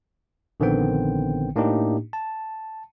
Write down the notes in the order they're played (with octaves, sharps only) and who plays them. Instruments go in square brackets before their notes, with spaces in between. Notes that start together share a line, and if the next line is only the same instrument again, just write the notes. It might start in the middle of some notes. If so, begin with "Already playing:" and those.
[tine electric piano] A#1 D3 D#3 B3 C4 G5
A2 A#3 D4 D#4 G4
A5